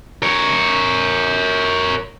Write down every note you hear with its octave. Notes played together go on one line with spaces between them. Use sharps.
A#4 C#5